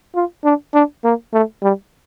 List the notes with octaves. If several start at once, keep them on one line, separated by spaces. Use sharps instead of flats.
F4
D4
D4
A#3
A3
G3